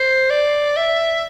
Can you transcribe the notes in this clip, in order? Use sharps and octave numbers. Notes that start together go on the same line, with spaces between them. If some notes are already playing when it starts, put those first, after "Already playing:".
Already playing: C5
D5
E5